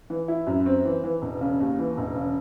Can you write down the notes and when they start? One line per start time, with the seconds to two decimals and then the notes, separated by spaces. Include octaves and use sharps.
0.10 E3
0.28 E4
0.47 F#2
0.66 C4
0.85 E3
1.04 E3
1.22 E1
1.41 C#3
1.60 D#2
1.79 E3
1.97 E1
2.15 C#3